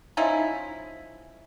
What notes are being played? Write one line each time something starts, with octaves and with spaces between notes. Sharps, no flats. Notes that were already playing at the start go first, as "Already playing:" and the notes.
F3 C#4 D#4 E4